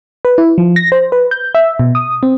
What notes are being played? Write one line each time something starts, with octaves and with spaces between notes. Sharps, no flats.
B4
E4
F3
A#6
C5
B4
G6
E5
B2
D#6
C4